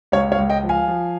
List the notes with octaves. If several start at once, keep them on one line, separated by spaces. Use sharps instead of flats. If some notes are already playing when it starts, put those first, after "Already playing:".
C#2 C#5 F5
C#5 F5
C#2
D#5 G5
F3
F5 G#5
F3